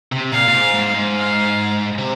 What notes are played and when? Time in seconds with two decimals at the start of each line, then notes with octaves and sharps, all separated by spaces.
0.12 C3
0.32 A#2 F5
0.48 A#2
0.54 G#2
0.74 G#2
0.95 G#2
1.16 F5
1.98 C3